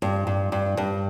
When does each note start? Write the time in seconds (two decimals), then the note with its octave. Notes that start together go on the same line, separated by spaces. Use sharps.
0.02 G2
0.27 G2
0.52 G2
0.77 G2